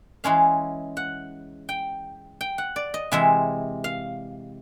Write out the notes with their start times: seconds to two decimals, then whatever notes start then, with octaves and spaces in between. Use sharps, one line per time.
0.24 E3 G#3 C#4 F5
0.97 F#5
1.69 G5
2.41 G5
2.58 F#5
2.76 D5
2.94 D#5
3.12 C3 E3 G#3 E5
3.84 F5